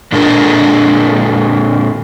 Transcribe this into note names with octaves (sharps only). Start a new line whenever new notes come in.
A#2 D3 G#3 D4 A#4